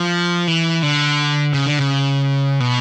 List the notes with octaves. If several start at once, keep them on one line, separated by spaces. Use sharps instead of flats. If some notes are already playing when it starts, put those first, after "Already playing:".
Already playing: F3
E3
D3
C#3
D3
C#3
B2